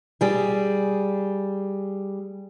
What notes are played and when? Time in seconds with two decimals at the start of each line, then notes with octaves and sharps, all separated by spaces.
0.21 G3 G#4